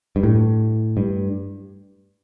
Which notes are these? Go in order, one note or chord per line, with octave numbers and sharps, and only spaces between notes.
G2
A2
G2